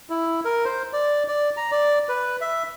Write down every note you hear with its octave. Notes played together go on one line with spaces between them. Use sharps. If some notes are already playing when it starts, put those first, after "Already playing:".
E4
A#4
C5
D5
D5
A#5
D5
B4
E5